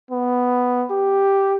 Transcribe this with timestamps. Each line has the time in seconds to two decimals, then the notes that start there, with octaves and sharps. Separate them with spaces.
0.11 B3
0.91 G4